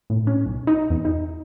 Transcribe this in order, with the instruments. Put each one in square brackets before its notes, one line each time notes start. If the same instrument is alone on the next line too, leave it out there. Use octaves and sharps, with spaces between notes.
[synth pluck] A2
C#4
B1
D#4
E2
D#4